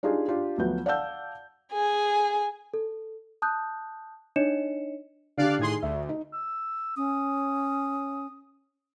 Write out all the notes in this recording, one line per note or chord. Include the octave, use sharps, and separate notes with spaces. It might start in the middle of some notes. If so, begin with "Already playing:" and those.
D4 D#4 F4 G4 G#4
D4 F4 G4
D2 F3 F#3 B3 G6
D5 F5 F#5 A5 E6 G6
G#4 G#5
A4
A5 D#6 F#6 G6
D4 D#4 C#5 D#5 C#7 E7
D3 D4 G4 D5 F5 F#6
A2 D#3 G#4 C6
D2 E5
D#4
E6
C#4 D#6